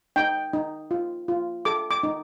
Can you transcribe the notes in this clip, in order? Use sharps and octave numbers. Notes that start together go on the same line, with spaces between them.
D#4 G5
D#4
F4
F4
A4 D6
D6
D#4